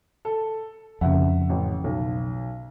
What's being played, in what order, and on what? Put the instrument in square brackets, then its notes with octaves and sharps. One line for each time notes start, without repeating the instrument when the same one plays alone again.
[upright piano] A4
[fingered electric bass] F2 C#3 [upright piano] E5 F#5
[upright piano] A1
B1